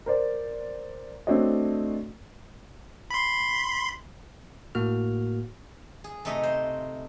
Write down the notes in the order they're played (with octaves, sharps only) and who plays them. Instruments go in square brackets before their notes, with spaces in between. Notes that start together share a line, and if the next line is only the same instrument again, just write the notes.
[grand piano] A#4 C5 D5
A3 C4 D4 F#4 C#5 D#5
[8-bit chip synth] B5 C6
[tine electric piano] A2 A#3 F#4 F6
[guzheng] G#4
C3 A3 D#4 D#5
C5